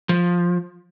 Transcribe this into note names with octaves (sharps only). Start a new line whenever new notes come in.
F3